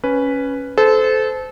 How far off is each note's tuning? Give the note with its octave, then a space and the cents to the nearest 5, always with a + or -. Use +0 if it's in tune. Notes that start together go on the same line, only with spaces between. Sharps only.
C#4 +0 B4 +0
A4 -25 C5 -30